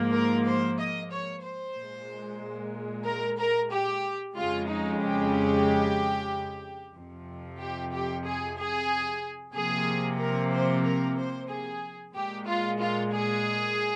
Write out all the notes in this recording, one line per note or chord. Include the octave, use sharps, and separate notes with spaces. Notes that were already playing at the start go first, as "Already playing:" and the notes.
Already playing: G#2 F3 A#3
A#4
C5
D#5
C#5
C5
A#2 G#3
A#4
A#4
G4
F2 C#3 G#3 F4
D#4
G4
F2 C3 F3
G4
G4
G#4
G#4
C3 F3 A#3 G#4
A#4
C5
A#4
C5
G#4
A#2 G#3 G4
F4
F4
G#4